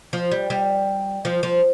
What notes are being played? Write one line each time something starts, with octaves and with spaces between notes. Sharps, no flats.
F3
G3
G3
F3
F3